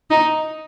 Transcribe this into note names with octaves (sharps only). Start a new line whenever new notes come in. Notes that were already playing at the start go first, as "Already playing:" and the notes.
D#4